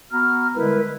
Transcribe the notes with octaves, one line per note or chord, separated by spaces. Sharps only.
B3 F#4 A#5 F6
D3 G3 G#3 E4 A#4 B4